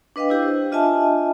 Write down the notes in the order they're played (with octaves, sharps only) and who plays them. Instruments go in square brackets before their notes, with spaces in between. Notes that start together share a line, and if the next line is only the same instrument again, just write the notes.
[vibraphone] D4 B4 D#5 F5 G5
D4 E4 G4
C5
D4 F4 D#5 E5 G#5 A5